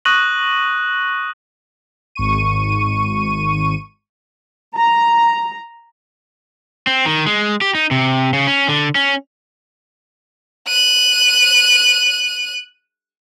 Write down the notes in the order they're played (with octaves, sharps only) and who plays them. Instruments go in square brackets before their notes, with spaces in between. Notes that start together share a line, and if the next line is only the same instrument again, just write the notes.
[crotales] C#6 D#6 F#6 A#6 D#7 F#7
[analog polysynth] G#1 C#6 D#7
[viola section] A#5
[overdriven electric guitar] C4
D#3
G#3
G4
D#4
C3
C#3
C#4
D3
C#4
[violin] F#6 D#7